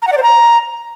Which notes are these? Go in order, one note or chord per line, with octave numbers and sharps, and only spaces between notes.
A#5
F#5
D5
C5
A#5